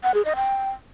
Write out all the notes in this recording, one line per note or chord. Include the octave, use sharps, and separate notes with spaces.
F#5
G#4
D#5
G5